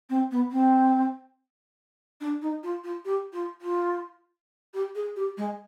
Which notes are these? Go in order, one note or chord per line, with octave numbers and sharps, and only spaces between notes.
C4
B3
C4
D4
D#4
F4
F4
G4
F4
F4
G4
G#4
G4
G#3